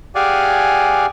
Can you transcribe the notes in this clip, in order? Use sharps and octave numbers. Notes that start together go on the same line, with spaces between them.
G4 G#4 D5 F5 F#5 G#5